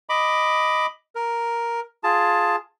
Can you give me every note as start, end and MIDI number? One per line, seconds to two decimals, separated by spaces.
0.09 0.86 75
0.09 0.86 83
0.09 0.86 86
1.15 1.80 70
2.04 2.56 65
2.04 2.56 68
2.04 2.56 81